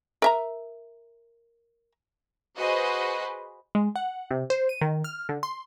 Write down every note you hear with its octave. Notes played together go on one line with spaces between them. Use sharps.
A#4 E5 A#5
F#4 G#4 B4 C5 D#5
G#3
F#5
C3
C5
D#7
D#3
F6
D3
C6